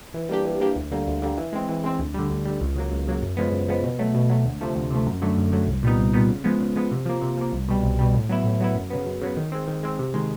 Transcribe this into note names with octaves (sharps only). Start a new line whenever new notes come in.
E3
G3 A#3 D4 G4
E3
G3 A#3 D4 G4
D2
D3 G3 A#3
D2
D3 G3 A#3
E3
G#3 C4
E3
G#3 C4
D2
D3 G3
D2
D3 G3
C#2
C#3 F#3 A#3
C#2
C#3 F#3 A#3
F#2
C#3 F3 G#3 B3
F#2
C#3 F3 G#3 B3
B2
F#3 A3
B2
F#3 A3
D2
C3 F3 A3
D2
C3 F3 A3
F#2
D3 F#3 A3
F#2
D3 F#3 A3
C2
A#2 G3 B3 D#4
C2
A#2 G3 B3 D#4
C#3
F3 G#3 B3
C#3
F3 G#3 B3
C3
F3 A#3
C3
F3 A#3
C2
B2 G3
C2
B2 G3
A2
F#3 B3 E4
A2
F#3 B3 E4
F#2
C#3 F#3 B3
F#2
C#3 F#3 B3
D#3
G#3 C4
D#3
G#3 C4
C3
D#3 G#3